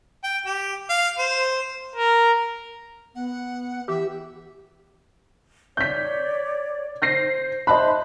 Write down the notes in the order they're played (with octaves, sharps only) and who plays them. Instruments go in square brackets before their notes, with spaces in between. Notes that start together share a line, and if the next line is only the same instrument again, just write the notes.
[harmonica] G5
G4
F5
C5
[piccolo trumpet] A#4
[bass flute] B3 [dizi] F#5
[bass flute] E3 [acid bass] G4 [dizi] E5
[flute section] C#5 D5 [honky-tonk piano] G6 B6
[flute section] C5 [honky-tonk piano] G6 A#6 C7
[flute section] C5 E5 C6 [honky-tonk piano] D#5 A5 F#6 [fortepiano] B5